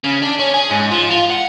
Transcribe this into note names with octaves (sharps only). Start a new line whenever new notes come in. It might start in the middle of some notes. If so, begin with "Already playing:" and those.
C#3
D4
C#4
G#4
G#2
F3
F4
F#5